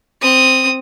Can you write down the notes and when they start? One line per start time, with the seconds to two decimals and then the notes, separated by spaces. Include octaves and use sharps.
0.22 C4 D#6